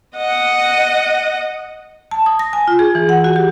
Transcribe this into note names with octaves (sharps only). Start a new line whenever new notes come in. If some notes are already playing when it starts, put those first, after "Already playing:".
D#5 F#5
A5
D#6
A#6
G#5
F4
G#4
E3
F#5
F#4
G4